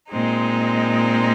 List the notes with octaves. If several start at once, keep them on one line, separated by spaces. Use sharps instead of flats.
A#2 G#3 C4 D#4